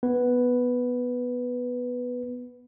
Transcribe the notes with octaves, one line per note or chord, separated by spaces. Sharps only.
B3 B4